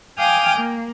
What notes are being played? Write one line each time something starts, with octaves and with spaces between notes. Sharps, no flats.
F5 G5 G#5 D6 D#6 F6
A#3